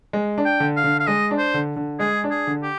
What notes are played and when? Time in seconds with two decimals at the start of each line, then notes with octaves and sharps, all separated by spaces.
0.13 G#3
0.38 D4
0.45 G5
0.60 D3
0.76 F5
0.84 D3
1.00 F5
1.07 G#3 D#5
1.31 D4
1.38 C5
1.54 D3
1.76 D3
1.99 G#3 G#4
2.24 D4
2.31 G#4
2.47 D3
2.63 G4